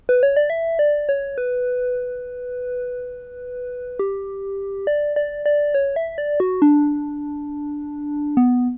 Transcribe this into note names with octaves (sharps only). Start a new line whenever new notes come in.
B4
C#5
D5
E5
D5
C#5
B4
G4
D5
D5
D5
C#5
E5
D5
F#4
D4
B3